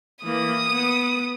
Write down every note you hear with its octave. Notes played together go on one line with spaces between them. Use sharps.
E3 A#3 D#6
B3